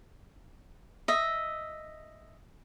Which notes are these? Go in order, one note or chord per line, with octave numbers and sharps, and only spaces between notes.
D#5 E5